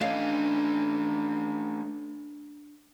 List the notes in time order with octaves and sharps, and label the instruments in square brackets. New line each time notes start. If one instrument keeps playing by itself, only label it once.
[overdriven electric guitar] A3 C#4 [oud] D4 D#5 F5